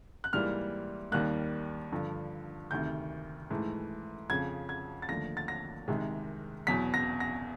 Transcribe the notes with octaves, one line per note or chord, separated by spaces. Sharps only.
F#6
G#2 E3 G3 A#3 F6
D#2 D#3 G3 A#3 F#6
G2 D3 F3
D2 C3 D#3 G6
G#2 E3 A3
F2 C#3 F3 G#6
G#6
A6
D#2 D3 F3 A3 A#6
A6
A#6
C2 C3 D#3 G#3
E2 B2 F#3 B6
A#6
A#6